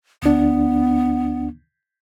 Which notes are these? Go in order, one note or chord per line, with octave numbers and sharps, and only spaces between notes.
D2 B3 D4